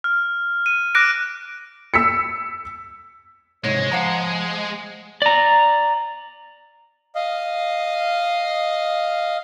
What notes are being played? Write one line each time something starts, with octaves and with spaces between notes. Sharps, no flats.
F6
D#7
D6 F#6 A#6 D7
E6 B6 C#7
C2 G#2 G#3 C#5
F3 F5 F#5 A#5
D5 A#5
D#5 F5